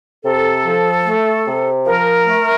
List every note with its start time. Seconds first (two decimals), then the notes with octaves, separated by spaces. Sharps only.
0.24 C3 A4
0.65 F3
1.05 A3
1.45 C3
1.86 F3 A#4
2.26 A3